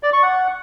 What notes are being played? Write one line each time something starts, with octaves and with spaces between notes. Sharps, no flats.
D5
C#6
F#5